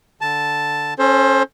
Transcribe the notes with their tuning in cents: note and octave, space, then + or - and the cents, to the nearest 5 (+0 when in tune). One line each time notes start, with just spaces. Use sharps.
D3 +0 A5 +0
C#4 -20 A4 -20 C5 +20